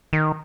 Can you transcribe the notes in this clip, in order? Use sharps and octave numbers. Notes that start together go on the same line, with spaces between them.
D#3